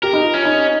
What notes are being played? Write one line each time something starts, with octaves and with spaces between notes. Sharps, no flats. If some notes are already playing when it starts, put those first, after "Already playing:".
G4 A#4
D#4
F4
C#4
D#4